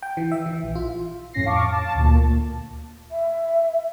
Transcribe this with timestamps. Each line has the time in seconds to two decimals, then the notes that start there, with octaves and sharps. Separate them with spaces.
0.03 G5
0.17 E3
0.32 E5
0.46 E3
0.63 A#1
0.75 F4
1.33 F2 A2 C#4 A#6 C7
1.46 F5 A5 C#6 D6
1.72 A5
1.95 D2 A#2
3.10 E5